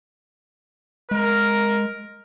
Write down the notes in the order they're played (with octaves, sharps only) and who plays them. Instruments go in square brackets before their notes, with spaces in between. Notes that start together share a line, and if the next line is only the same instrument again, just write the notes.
[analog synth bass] G#3 [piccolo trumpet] A#4